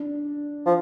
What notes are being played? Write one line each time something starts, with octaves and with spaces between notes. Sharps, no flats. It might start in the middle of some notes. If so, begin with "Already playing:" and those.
Already playing: D4
F3